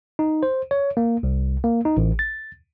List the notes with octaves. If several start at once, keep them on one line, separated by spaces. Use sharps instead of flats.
D#4
C5
C#5
A#3
C2
A#3
D#4
A1
A6